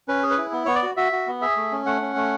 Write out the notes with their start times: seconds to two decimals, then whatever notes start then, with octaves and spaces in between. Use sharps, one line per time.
0.08 C#4 B4
0.23 G#4
0.31 B4
0.38 E4
0.52 B3
0.66 B3 C#5
0.75 D5
0.83 F#4
0.97 F#4 E5
1.12 F#4
1.27 B3
1.41 G#4 E5
1.56 A3
1.72 C#4
1.86 A3 F#5
2.01 C#4
2.16 A3